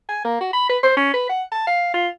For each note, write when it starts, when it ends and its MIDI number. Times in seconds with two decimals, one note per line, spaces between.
0.09 0.22 80
0.25 0.38 58
0.41 0.52 66
0.53 0.69 83
0.69 0.78 71
0.83 0.94 72
0.97 1.11 61
1.14 1.28 71
1.29 1.43 78
1.52 1.65 81
1.67 1.94 77
1.94 2.08 65